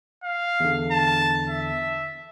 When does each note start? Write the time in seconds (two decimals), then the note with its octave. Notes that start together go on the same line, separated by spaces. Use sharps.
0.24 F5
0.60 E2 D3
0.92 A5
1.49 E5